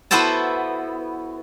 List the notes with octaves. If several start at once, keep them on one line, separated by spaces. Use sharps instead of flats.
B3 E4 F#4 A4 C5 A5